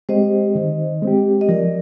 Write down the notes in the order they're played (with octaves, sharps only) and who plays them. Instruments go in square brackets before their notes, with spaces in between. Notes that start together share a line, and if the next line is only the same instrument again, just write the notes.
[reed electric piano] G#3 C4 G4 [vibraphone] C5 D#5
[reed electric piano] D#3
G#3 C4 G4
[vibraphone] D#5
[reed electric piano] F3 [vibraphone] A#4 D5